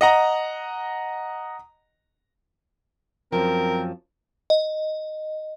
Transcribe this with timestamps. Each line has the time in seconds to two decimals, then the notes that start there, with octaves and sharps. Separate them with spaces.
0.01 D#5 F#5 A#5
3.33 F#2 F3 C4 A#4
4.50 D#5